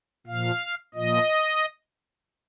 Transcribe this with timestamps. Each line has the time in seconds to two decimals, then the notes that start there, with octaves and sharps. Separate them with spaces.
0.27 A#2 F3 F5
0.94 A#2 F3 D#5